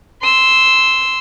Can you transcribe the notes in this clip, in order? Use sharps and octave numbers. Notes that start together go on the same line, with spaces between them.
C6 E6